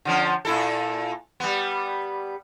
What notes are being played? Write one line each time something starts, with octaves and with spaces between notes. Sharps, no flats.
D3 F3 C#4
A#2 E4 A4
G3 B3